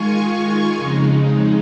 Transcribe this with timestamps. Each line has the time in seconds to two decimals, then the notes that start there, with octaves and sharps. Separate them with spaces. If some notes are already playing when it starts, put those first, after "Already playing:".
Already playing: D#3 G#3 F4 G#5 C#6
0.78 F2 C#3 G#3 D#4